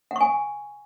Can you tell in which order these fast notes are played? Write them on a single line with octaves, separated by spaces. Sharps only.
F#5 C#6 G#5